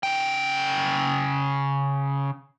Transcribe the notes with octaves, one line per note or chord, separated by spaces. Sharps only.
C#3 G5